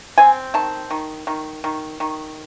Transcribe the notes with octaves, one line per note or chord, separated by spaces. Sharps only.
C4 G#5
D#3 A5
D#3
D#3
D#3
D#3